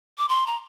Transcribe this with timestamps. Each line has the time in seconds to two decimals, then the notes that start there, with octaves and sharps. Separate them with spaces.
0.18 D6
0.29 C6
0.47 A#5